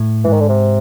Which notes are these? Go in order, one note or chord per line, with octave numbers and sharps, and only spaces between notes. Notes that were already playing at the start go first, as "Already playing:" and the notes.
Already playing: A2
G#2 E3
D#3
D3
C3